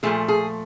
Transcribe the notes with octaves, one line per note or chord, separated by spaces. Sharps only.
A#2 F3 A3 G#4
G#4